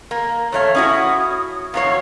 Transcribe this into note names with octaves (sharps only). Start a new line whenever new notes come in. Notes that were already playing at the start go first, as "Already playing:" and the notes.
A#3
E2 A3 C#5 F5
C#4 E4 F#4 D#6
E2 F#3 C#5 F5